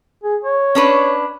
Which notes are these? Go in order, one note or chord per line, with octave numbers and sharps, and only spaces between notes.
G#4
C#5
C#4 D4 B4